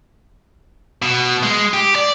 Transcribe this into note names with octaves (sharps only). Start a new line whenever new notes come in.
B2
G#3
G4
D5